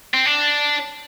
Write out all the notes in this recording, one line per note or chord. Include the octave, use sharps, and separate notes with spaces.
C4
D4